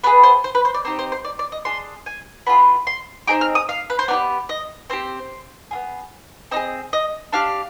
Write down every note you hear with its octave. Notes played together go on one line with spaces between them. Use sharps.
B3 F4 G#4 B4
C5
C5
B4
C5
D5
C4 D#4 G4 C5
C5
C5
D5
D5
D#5
D4 G#4 C6
G#5
B3 D4 F4 G#4 B5
C6
C4 D#4 G#4 D6
F6
D#6
F5
B4
C5
B3 D#4 D5
G4
D#5
C4 G4 C5
B3 F4 G#4
C4 D#4 G#4 D#5
D#5
D4 G4 F5